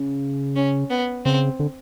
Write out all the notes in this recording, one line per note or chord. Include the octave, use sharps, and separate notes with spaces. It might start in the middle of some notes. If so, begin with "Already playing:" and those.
Already playing: C#3
C#4
B3
C#3 C4
D3